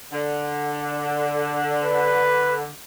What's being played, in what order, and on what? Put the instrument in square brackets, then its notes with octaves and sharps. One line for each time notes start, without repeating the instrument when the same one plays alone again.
[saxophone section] D3
[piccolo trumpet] B4